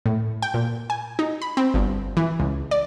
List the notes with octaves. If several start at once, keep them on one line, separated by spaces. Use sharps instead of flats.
A2
G5
A#2
G#5
D#4
B5
C4
G1
E3
C#2
D5